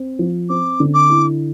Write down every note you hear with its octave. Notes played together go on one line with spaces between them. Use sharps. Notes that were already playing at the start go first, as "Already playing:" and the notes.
Already playing: C4
F3
C4 D6
D3
D6
E4